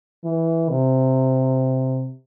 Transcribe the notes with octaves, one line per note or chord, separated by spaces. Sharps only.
E3
C3